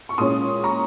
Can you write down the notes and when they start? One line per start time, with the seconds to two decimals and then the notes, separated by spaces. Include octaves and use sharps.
0.09 C#6
0.18 A#2 G#3 C#4 C6 D#6
0.63 A#5 C#6